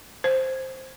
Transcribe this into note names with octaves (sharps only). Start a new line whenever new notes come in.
C5